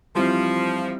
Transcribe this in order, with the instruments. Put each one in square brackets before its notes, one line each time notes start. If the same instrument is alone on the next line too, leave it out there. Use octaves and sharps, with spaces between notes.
[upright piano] E3 G3 C4 [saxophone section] F3